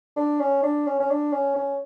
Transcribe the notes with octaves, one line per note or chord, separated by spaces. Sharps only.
D4
C#4
D4
C#4
C#4
D4
C#4
C#4